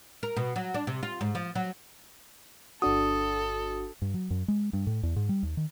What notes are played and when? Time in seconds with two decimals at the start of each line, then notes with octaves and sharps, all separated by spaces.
0.23 A#4
0.37 B2
0.56 F#3
0.74 D4
0.87 C3
1.03 F4
1.21 G#2
1.35 F3
1.55 F#3
2.82 G1 D4 F#4 A4 D#6
4.02 G2
4.14 F#3
4.30 F#2
4.48 G#3
4.73 G2
4.87 A2
5.03 E2
5.16 G#2
5.29 G3
5.43 D#2
5.57 D#3